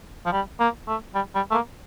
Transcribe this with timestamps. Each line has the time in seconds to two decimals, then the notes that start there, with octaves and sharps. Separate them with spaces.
0.25 F3
0.32 G3
0.59 A#3
0.87 A3
1.14 G3
1.35 G3
1.51 A3
1.54 A#3